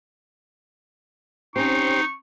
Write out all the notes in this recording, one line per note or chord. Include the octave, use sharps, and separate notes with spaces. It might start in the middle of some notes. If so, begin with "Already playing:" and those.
C4 C#4 D#4 G4 C5 C#6